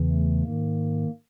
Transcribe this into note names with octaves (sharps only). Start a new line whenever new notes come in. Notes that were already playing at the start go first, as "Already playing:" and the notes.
Already playing: E2 C#3 E3
A3
G#2 D#3 A#3